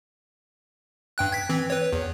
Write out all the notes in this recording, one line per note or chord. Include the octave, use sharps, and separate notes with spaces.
G2 G5 F#6
G#6 B6
E3 C4
B4 C#5
E2